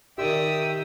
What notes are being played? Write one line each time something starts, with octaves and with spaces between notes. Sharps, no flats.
D#3 G4 D5 E5 G5 D#6 E6